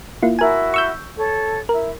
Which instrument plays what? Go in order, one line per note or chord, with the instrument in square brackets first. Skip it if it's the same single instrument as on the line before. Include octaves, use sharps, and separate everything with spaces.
[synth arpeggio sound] A#3 E4 F4
[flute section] E4 F#4 [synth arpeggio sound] A#4 G#5
[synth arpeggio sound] C#6 E6 G6
[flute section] A4 C#5
[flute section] E4 [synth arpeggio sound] A#4